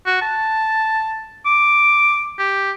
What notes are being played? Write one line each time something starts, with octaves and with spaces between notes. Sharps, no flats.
F#4
A5
D6
G4